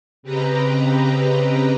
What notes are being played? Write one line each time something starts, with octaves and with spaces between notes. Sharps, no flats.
C#3 C4 G4 B4 D#5 A#5